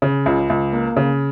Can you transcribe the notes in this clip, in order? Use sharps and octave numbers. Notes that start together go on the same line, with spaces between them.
C#3
C#2
C#2
A#3
C#3